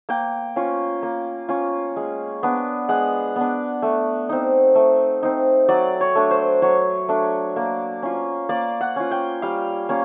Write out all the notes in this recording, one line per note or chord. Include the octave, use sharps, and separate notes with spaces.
A#3 G5
C#4 F4
A#3
C#4 F4
G#3
B3 D4
G#3 F#5
B3 D4
A3
C4 D#4
A3
C4 D#4
F#3 D5
C#5
A3 D4
C5
F#3 C#5
A3 D4
A#3
C#4 F4
A#3 D5
F#5
C#4 F4
G5
G3 F5
A#3 C#4